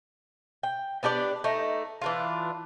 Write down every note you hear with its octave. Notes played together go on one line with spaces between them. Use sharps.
G5
B3 D4 G4 D5
A3 D#4
E3 D4 F4